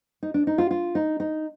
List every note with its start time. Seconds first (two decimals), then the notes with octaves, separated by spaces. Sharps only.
0.23 D#4
0.34 D4
0.47 D#4
0.58 F4
0.71 F4
0.95 D#4
1.20 D#4